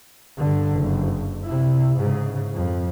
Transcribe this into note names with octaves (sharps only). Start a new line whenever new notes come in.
G2 D3
F#1
C3 E4
G#2 C#3
F2